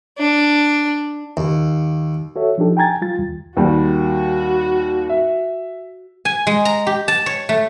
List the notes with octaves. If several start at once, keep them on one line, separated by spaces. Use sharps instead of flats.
D4
D#2
F#4 A4 C#5 E5
F3 D4 D#4 G4 A4
G5 G#5 A#5 G#6 A6
G3 F4 A6
D#2
D#2 G3 F#4
E5
G#5
G#3
A#5
G4
A5
C#5
A3